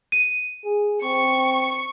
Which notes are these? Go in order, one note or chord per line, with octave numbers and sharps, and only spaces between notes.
D#7
G#4
C4 C#6